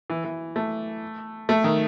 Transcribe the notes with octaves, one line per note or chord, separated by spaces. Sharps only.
E3
E3
A3
A3
D#3